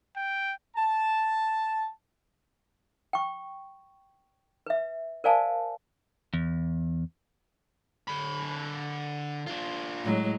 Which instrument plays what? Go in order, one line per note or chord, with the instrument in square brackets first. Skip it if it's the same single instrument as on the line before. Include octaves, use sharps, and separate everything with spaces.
[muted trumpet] G5
[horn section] A5
[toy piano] G5 C#6
B4 E5
A#4 C5 D5 F5 G#5 A5
[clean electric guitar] E2
[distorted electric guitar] D3 B5
D4 F4
[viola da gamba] A2 F#3 G#3